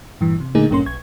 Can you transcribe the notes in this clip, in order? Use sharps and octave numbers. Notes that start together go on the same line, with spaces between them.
G2 A#2 E3
C3
A#2 D3 A3 A#3 D#4 G#4
A1 G2 A#2 A#3 C#4 C6
B1 C#6 G#6